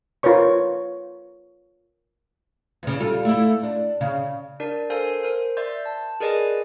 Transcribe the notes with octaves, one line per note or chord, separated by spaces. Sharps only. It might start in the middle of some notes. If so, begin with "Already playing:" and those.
F4 A#4 B4 C#5 C#6
E2 C#3
G3 F4 A4
A3 E4
D4
C#3
D4 A#4 D5
A4 A#4 C5 F5 G#5
A#4 C5
D5 E5 C6 G6
A5
G#4 A#4 B4 D5 D#5 G#5